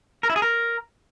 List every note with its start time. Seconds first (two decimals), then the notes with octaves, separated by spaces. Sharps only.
0.23 A#4
0.30 E4
0.36 G#4
0.42 A#4